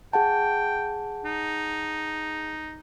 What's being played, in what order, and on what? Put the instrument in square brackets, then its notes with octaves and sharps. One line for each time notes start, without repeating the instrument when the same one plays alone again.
[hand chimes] G#4 F#5 A5 [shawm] G5
[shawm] D#4